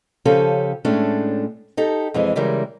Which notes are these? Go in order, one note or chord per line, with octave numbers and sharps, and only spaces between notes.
C#3 F3 C#4 G4 A4
A2 G#3 A3 C#4 D4
D#4 G4 A4
F2 E3 G#3
C#3 E3 G3 G#3 A#4